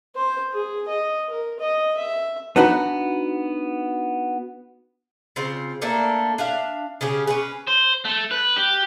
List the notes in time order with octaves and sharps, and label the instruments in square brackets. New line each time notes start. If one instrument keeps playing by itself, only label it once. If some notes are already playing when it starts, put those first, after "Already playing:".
[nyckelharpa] C5
G#4
D#5
A#4
D#5
E5
[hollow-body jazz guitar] B3 D4 D#4 F#4 B4
[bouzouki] C#3 C4 F4
A3 A#3 D4 A4
D4 E5 F5
C#3 C#4 G4 G#4
C#4 G#4 B4
[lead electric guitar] C5
A3
B4
G4